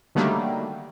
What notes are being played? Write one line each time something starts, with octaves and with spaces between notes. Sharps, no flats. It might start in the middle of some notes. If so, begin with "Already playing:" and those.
D3 D#3 F#3 G3 A3 A#3